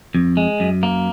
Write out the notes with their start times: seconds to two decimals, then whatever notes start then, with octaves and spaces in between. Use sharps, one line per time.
0.15 F2
0.37 G#3
0.60 F#2
0.83 A#3